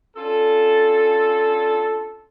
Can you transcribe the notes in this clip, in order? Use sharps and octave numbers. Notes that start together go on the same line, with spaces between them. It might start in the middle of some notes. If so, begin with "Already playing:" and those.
C#4 D4 F4 A4